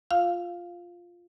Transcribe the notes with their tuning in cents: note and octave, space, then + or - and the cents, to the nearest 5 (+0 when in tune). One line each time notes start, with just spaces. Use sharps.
F4 +0 F5 +0